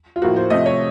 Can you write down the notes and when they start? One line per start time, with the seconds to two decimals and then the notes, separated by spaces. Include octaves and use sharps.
0.16 F4
0.22 A2 F3 A#3 F#4
0.36 C5
0.50 C3 F3 A3 D#5
0.66 C#5